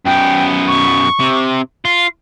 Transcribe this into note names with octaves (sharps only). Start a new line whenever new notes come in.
F#2 B3 G5
C#6
C3
F4 C7